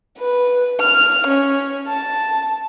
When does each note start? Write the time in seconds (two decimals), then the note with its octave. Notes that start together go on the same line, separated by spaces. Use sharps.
0.18 B4
0.80 F6
1.27 C#4
1.88 A5